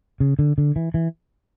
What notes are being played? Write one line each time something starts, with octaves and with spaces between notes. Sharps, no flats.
C#3
D3
D3
E3
E3